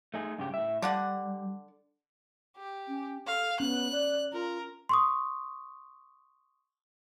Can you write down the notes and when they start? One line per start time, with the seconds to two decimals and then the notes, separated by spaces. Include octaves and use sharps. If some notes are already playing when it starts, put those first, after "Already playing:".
0.14 A3 D#4 G#4
0.38 G2 C#3 G4
0.54 A2 E5
0.82 D3 G3 D4 F#5
2.57 G4
2.88 C#4
3.27 A4 F5
3.60 B3 C#4 F#6
3.92 D5
4.33 F4 A#4
4.89 C6 C#6 D#6